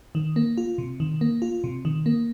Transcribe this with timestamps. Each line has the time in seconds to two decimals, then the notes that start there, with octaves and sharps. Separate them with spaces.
0.15 D#3
0.36 A#3
0.58 F4
0.78 C3
1.00 D#3
1.21 A#3
1.42 F4
1.64 C3
1.85 D#3
2.06 A#3